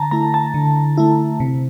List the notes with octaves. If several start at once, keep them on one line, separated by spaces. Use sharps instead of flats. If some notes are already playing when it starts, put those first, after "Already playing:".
Already playing: D3 A5 A#5
A3 E4 A#5
A5
D3
A3 E4
C3